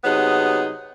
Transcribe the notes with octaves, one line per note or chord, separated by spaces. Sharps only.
C3 F#3 B3 D#4 G#4